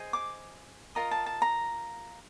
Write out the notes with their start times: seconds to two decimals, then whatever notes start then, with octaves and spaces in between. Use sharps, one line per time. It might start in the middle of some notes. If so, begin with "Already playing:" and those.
Already playing: G#4 C5 D#5
0.13 D6
0.95 F4 A#4 D#5 A#5
1.11 A5
1.26 A5
1.42 A#5